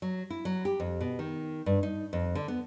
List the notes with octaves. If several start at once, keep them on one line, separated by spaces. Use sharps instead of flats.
F#3
E4
F#3
G4
F2
B2
D#3
G2
D#4
F2
D3
B3